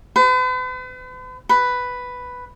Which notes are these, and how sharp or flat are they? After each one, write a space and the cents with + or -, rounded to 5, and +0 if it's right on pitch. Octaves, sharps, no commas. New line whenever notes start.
B4 +45
B4 +5